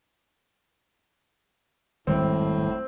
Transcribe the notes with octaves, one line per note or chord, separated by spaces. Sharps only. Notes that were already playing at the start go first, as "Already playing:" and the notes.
G#1 F2 A2 G3 A3 C4